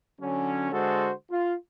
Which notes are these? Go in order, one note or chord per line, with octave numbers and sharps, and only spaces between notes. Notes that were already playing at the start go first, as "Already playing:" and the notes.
D3 F#3 C#4
D3 G#3 F#4 A4 C5
F4